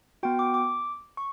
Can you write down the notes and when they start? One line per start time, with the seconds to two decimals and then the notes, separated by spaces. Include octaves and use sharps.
0.23 B3 F#4 G5
0.39 D6
0.54 D6
1.17 C#6